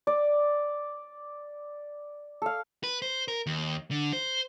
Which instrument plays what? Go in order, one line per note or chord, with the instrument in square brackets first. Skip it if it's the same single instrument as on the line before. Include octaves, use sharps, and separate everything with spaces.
[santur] D5
A4 F5
[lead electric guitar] B4
C5
A#4
D#2
D3
C5